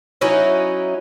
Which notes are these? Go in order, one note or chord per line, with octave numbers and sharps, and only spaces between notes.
F#3 C#4 D#4 E4